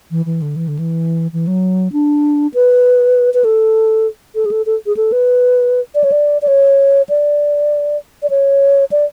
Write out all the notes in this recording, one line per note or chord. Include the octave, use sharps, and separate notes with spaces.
E3
E3
D3
E3
D3
E3
E3
F#3
D4
B4
B4
A4
A4
G#4
A4
A4
G#4
A4
B4
D5
C#5
D5
D5
C#5
D5
D5
C#5
D5